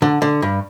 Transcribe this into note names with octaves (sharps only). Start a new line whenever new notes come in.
D3
D3
G2